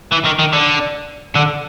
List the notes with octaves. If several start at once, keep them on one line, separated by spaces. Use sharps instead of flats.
E3
D#3
D#3
D3
D3